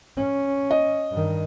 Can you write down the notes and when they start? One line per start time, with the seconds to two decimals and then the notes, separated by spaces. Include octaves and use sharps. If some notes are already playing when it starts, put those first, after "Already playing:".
0.16 C#4
0.71 D#5
1.12 G2 D#3